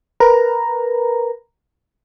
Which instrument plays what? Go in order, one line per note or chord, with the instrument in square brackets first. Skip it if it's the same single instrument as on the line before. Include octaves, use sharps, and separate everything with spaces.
[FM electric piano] A#4 B4 A#5